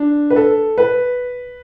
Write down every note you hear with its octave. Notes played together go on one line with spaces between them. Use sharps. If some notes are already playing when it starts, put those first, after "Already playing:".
Already playing: D4
B4
A4
B4